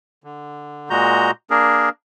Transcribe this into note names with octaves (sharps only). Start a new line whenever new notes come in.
D3
A#2 G#3 F#4 A#5 G6
A#3 D4 G#4 A#4